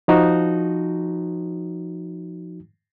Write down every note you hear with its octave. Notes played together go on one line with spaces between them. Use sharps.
F3 D#4 F#4